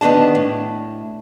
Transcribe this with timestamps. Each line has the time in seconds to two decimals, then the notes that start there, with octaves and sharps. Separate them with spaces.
0.01 D2 D#3 B3 D4 A5
0.35 A2